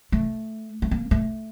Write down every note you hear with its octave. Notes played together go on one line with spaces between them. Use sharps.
A3
A3
A#3
A3